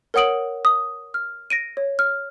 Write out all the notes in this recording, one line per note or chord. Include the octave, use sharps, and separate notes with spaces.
A#4 C#5 F#5 D#6 D7 F#7
D#6
F6
A#6 D7 D#7
C#5
F6